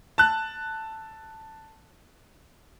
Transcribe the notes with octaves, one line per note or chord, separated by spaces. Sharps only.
A5 F#6